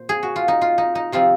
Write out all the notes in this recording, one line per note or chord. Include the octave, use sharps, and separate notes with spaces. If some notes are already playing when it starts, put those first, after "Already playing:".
Already playing: A#2 C5
G#4
F#4
F4
D#4
F4
D#4
D#4
C3 F3 C4 D#4 F4